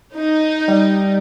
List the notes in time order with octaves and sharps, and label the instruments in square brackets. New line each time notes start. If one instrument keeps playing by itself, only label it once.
[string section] D#4
[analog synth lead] G3